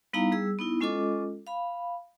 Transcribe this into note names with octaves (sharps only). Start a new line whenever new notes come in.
G3 B3 D#4 E4 F5 A#5
G3 G#4 E6
B3 D#4 E4
G#3 C#4 F4 A4 D#5 D6
F5 B5